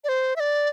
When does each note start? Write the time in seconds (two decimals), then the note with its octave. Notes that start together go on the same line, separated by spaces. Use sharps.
0.04 D5
0.09 C5
0.36 E5
0.40 D5